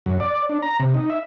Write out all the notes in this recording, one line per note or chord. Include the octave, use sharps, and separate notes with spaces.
F#2
D5
D4
A#5
C3
D#4
E5